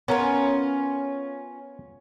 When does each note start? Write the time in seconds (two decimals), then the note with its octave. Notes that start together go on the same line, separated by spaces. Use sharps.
0.08 B3 C#4 F4 A#4